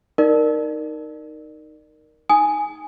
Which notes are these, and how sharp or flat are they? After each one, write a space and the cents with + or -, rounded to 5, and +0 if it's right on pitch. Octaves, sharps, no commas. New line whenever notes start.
D#4 +0 A#4 +0 D5 +25
D#4 +5 G#5 +0 D#6 +0